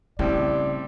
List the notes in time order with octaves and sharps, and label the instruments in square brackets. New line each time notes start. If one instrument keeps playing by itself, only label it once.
[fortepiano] A2 G3 C4 [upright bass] C#3 [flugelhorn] D5